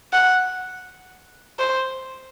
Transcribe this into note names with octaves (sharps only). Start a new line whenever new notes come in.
F#5
C5